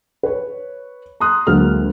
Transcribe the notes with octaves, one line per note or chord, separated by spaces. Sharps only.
B4 C#5
A#5 C6 D#6 F#6
D2 F#3 G#3 A#3 F6